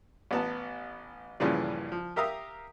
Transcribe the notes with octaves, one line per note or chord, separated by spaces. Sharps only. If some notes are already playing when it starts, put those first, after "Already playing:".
A1 B3 A5
A1 G2 A#2 C#3 E3 F3
F3
G4 A#4 E5 F5 A#5 D#6